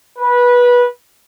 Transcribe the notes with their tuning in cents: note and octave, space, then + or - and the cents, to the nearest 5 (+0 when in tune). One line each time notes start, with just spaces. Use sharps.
B4 -20